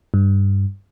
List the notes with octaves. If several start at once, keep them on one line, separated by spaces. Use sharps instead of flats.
G2